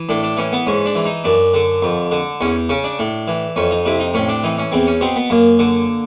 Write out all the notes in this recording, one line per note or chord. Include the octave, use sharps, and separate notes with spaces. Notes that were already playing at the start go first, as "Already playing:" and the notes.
Already playing: E3
A2 D4
D4
E3 C#4
B3
G#2 C#4
D4
E3
D#4
F#2 D4
D3
F2
D3
E2 C#4
C#3 C#4
D4
A2
E3
F2 C#4
D#4
C3 E4
D#4
A2 C#4
D4
E3 D#4
C#4
E2 C4
C#4
B2 C4
B3
F#2 A#3
D3